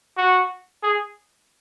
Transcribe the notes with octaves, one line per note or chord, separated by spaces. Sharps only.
F#4
G#4